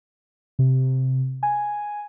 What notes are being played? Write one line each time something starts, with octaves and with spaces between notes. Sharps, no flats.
C3
G#5